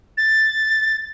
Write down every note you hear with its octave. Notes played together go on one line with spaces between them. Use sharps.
A6